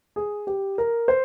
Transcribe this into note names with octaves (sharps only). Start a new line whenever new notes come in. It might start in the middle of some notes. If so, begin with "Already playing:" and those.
G#4
G4
A#4
C5